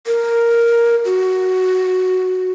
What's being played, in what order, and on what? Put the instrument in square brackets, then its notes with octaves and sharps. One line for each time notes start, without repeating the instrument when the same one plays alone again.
[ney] A#4
F#4